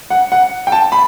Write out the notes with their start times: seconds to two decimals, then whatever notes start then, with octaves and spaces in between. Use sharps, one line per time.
0.10 F#5
0.32 F#5
0.67 G5
0.72 A5
0.92 B5